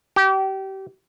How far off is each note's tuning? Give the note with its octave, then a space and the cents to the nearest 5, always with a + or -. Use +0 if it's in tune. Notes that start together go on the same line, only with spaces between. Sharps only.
G4 -30